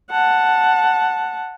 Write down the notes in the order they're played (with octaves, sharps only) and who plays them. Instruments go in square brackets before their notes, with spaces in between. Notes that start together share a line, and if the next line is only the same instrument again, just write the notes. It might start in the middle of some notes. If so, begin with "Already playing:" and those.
[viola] F#5 A5